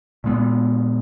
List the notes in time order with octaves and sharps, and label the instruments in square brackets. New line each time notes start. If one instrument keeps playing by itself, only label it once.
[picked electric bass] A#2 G#3 B3